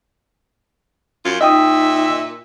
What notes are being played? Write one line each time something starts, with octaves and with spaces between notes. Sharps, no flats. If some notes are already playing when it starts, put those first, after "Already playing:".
F#2 F4
A#2 D#4 D#5 E5 G5 D#6